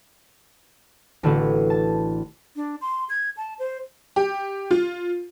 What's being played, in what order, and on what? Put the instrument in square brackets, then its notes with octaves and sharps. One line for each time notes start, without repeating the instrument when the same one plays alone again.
[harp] A1 D3 A3 F#4 B4
A5
[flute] D4
C6
G#6
A5
C5
[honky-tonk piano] G4
F4